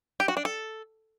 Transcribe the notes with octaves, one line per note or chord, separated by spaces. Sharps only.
G4
F#4
D4
A4